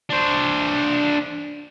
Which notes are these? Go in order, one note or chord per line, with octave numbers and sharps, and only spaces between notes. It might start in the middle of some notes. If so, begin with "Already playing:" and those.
D4 C5